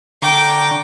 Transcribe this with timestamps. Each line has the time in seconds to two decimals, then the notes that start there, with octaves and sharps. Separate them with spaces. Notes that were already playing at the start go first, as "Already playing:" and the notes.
0.22 D3 G5 A#5 C#6 D6